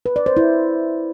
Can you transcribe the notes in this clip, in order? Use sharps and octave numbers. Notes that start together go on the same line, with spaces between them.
B4
D5
C5
E4